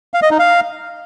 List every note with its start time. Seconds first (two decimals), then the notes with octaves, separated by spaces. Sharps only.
0.14 F5
0.22 D#5
0.31 D#4
0.39 F5